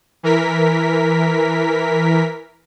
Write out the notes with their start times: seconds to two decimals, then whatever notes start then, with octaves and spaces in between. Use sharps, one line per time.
0.23 E3 A#4 B6